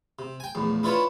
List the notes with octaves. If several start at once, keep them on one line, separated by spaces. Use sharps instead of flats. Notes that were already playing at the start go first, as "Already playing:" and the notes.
C3
G5 G#5
A#1 E2 A2
D4 E4 F4 B4 C#5